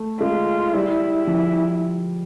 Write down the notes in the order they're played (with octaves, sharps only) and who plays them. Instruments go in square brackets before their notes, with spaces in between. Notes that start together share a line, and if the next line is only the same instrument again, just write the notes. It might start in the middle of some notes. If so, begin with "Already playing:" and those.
Already playing: [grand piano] A3
[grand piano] G#3 [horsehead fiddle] F4
[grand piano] G3 [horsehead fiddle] E4
[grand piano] F3